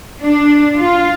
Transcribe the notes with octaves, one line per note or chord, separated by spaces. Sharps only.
D4
F4